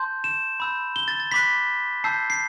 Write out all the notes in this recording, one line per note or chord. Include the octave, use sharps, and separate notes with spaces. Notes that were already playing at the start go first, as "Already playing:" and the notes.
Already playing: A5 C6 G6
E7
B5 E6 G6
G7
A6
A6
B5 D6 F#6 B6
A5 E6 G6 C7
C7